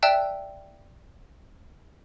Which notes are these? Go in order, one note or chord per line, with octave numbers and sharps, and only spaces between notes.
D5 E5 G5 A5 E6 F#6